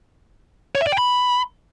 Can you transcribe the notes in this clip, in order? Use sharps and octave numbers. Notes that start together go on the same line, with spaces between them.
C#5
E5
D5
G5
B5